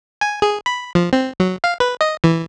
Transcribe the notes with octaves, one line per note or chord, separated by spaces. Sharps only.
G#5
G#4
B5
F3
C4
F#3
F5
B4
D#5
E3